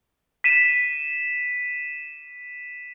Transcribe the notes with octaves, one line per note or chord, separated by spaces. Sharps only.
B6 D#7 E7